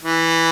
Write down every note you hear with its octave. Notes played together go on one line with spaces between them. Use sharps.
E3